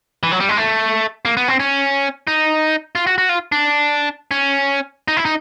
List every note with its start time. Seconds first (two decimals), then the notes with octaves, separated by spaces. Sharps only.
0.23 E3
0.32 F#3
0.40 G3
0.49 G#3
0.57 A3
1.25 A#3
1.37 B3
1.48 C4
1.60 C#4
2.27 D#4
2.95 F4
3.07 F#4
3.18 F#4
3.29 F4
3.52 D4
4.31 C#4
5.08 D#4
5.17 E4
5.25 D#4